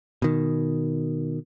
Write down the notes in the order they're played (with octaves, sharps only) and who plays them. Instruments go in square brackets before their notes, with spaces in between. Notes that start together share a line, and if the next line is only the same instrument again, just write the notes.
[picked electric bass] B2 D#3